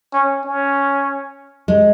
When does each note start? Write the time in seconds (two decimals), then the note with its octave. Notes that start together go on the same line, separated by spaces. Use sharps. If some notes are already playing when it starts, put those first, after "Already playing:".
0.13 C#4
0.45 C#4
1.68 G#3